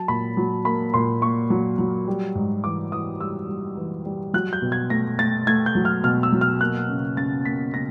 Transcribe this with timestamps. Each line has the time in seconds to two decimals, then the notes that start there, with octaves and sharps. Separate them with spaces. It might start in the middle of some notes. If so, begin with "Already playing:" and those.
Already playing: F#3 A5
0.08 A#2 B5
0.37 F#3
0.65 A#3 B5
0.94 A#2 C6
1.22 A#3 C#6
1.50 F#3
1.78 F#3
2.08 G3
2.35 G#2
2.64 E3 D6
2.92 E3 D#6
3.20 G3 E6
3.49 G3
3.77 E3
4.06 G3
4.34 F#3 F#6
4.53 G6
4.62 B2
4.72 G#6
4.90 A3 A#6
5.19 A3 A6
5.47 A3 G#6
5.66 G6
5.75 F#3
5.85 F6
6.04 B2 F6
6.23 E6
6.32 F#3
6.41 F6
6.61 A#3 F#6
6.89 C#3
7.17 C#3 A6
7.45 A#3 B6
7.74 C#3 A#6